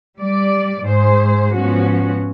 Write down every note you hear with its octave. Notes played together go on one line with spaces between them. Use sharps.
G3 D5
G#2 G#4 C5
G#2 F3 B3 C#4 F#4